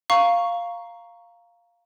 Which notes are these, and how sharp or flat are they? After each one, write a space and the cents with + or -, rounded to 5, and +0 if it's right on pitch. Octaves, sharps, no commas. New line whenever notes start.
F5 +0 A#5 +0 C#6 +0